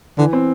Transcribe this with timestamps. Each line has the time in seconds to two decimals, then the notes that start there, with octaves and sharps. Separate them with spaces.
0.18 D3 E3
0.33 C4